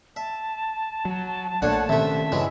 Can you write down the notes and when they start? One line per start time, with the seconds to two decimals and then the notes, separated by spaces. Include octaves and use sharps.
0.16 E5 A5
1.05 F#3
1.62 A#1 A#2 A3 D4 C#5 F#5
1.89 C3 D#3 A3 C#4 E5
2.32 G2 C#3 E3 F#3 G#3